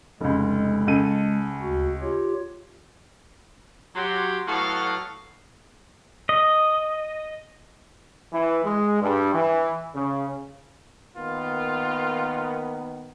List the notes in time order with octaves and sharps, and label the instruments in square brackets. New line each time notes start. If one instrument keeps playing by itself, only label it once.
[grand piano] F1 C#2 [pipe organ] G#3
[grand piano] C#2 A4 D#7
[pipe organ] D2 F#4
F4 G4 C#5
[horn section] F#3 G4 C6
A2 F#3 B3 F#4 A4 F5
[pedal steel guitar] D#5
[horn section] E3
G#3
G2
E3
C#3
[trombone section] D#3 A#3 B3 [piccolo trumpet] F4